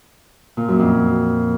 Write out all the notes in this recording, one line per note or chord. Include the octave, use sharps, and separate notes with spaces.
A#2
F#2
F2